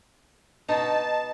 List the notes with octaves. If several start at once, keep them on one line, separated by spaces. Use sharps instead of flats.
B2 D#4 A5